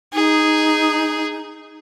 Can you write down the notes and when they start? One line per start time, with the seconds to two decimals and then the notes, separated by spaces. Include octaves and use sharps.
0.14 D#4 G#4